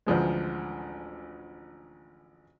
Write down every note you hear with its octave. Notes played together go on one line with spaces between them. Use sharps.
A1 D2 F3 G#3